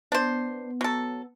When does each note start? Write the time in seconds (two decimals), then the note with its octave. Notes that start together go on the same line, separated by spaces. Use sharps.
0.12 B3 D4 C5
0.81 F#3 A4